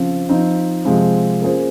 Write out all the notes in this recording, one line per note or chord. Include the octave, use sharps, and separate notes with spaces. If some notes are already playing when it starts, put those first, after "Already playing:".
Already playing: C#3 F3 C4
F3 C4 D#4
C3 F3 G#3 C4
A#3 C#4 F4 G#4 C5